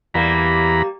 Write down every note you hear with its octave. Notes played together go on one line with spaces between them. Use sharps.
E2 G3 A#3 A#5 B5